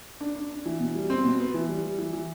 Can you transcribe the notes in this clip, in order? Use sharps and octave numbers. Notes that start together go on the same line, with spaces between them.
D4
D4
D4
E3
B2
G3
C4
B2
B3
E3
G3
G3
E3
E3